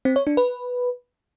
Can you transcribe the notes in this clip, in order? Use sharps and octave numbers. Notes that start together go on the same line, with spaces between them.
C4
C#5
D4
B4